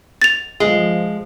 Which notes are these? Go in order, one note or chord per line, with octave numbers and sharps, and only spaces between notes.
A6 F7
F3 G#3